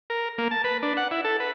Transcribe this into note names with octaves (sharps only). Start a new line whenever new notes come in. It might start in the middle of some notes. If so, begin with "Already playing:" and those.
A#4
A#3
A5
B4
D4
F#5
E4
A4
B4